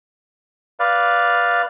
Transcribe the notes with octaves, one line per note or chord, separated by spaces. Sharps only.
B4 D5 F5